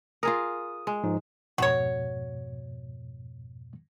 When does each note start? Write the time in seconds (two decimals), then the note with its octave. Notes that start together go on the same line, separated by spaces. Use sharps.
0.23 F4 G#4 A#4 D#6
0.87 G#3
1.04 G#2 F3 D#4
1.58 F2 G#2 B2 F#4 C#5